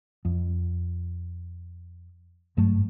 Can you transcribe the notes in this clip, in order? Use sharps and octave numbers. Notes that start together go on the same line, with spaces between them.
F2
G#1 G2 F#3 A3